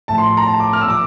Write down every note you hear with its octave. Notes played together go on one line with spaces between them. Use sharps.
A2 F3 A5
C6
A#5
A5
D6
F6
E6
A#2 F3 D6